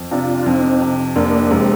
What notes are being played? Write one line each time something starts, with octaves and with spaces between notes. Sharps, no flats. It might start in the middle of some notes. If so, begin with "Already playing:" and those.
Already playing: F2
C3 D4 F4
F2 C4 D#4
C3
F1 A#3 D4
F1 G#3 C4